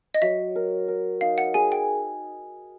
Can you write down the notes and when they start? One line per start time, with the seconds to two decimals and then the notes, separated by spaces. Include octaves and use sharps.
0.14 D#5
0.22 F#3 E5
0.56 A#4
0.88 A#4
1.21 D#4 F5
1.38 F#5
1.54 G#4 G#5
1.72 G5